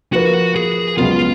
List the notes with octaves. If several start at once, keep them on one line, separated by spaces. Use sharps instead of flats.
F3 A#3 F4 F#4 B4
G#4
C#2 C#3 F#3 B3 F4